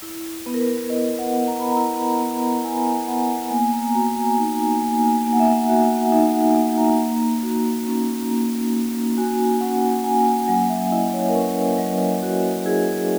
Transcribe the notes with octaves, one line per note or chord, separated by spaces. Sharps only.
E4
B3 B4
A#4
B4
E4 D#5
F#5
B3
A#5
B5
E4 A#5
B3
E4 G#5
B3 F#5
A#3 G#5
A#5
F#4 A#5
G#5
D#4
A#3 G#5
A#3 G#5
F#5
E5
F#5
F#4 E5
F#5
D#4 E5
F#5
A#3
A#5
A#3
F#4
C#4
A#3
A#3
F#4 G#5
C#4 F#5
A#3 G#5
G#5
F#3 F#5
E5
E4 D#5
C#5
A#4
C#4 B4
F#3 D#5
F#3 F#4
E4 G#4